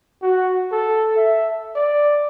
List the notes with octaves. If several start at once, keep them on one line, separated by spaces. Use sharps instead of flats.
F#4
A4
E5
D5